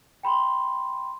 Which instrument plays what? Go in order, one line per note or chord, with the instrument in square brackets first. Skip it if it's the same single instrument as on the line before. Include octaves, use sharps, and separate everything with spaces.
[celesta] G5 B5 C6